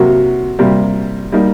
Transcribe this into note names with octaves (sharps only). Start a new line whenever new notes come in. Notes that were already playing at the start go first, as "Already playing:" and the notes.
Already playing: C3 F#3 A#3 F#4 A#4
C3 G3 A#3
G3 A#3 D#4